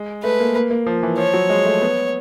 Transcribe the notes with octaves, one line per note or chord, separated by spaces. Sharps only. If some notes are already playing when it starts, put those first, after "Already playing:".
Already playing: G#3
A3 B4
A#3
A#3
A#3
F3
E3
F3 C#5
F#3
G#3
A3
B3